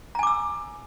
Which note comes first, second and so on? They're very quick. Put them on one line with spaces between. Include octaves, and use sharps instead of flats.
A#5 G#5 D6 E6